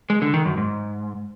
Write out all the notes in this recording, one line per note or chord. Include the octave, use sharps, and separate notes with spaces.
G#3
D3
D#3
F#2
G#2